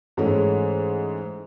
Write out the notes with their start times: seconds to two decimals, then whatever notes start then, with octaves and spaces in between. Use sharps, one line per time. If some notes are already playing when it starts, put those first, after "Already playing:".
0.17 G#2 E3 G#3 A3 C#4